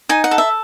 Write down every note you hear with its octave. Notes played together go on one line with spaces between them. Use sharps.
D#4 G#5
F#5
A4
E5